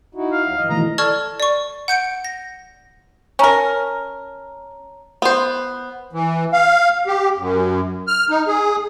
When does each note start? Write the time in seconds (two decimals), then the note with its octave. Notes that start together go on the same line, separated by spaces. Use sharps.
0.15 D#4 E4 F#4
0.32 F5
0.46 D2 F#3
0.57 G2 E3 D#5
0.70 B2 D#3 E3 A3 D#5 A#5
0.98 A4 D5 A5 C#6 F6 G#6
1.40 D5 C#6
1.88 F#5 G6 C#7 D7
2.25 A#6
3.39 C#4 A#4 C#5 A5 A#5
5.22 B3 C5
6.13 E3
6.53 F5
7.07 G4
7.38 F#2
8.08 F6
8.30 D#4
8.47 G#4